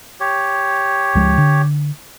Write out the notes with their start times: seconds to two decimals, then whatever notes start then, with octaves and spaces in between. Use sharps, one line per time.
0.20 G4 C#5
1.15 C#2 F3 G#3
1.38 D3